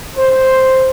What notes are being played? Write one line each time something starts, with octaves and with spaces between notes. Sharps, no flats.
C5